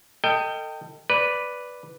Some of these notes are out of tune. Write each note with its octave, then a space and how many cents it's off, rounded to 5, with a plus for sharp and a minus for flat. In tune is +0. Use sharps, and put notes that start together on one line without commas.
A4 +40 D#5 +0 G5 +0
B4 +0 D5 +0